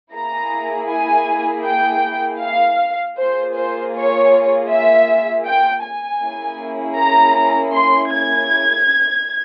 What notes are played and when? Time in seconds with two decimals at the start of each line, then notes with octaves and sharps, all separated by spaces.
0.14 A#3 E4 G#4 A#5
0.90 G#5
1.66 G5
2.42 F5
3.18 A#3 F4 G#4 C5
3.56 C5
3.94 C#5
4.70 E5
5.47 G5
5.84 G#5
6.22 A#3 C#4 E4 G#4
6.99 A#5
7.75 C6
8.13 G#6